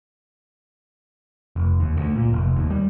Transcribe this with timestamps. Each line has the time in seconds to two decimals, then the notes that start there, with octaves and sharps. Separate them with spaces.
1.56 F1
1.80 D#2
1.97 D2
2.16 A#2
2.33 F1
2.57 D#2
2.70 G3